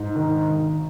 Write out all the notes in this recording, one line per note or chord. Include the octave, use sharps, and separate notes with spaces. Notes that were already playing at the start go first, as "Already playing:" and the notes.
Already playing: G#2
D#3
G#1